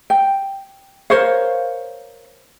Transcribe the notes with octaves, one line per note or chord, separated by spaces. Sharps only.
G5
A#4 C5 C#5 F5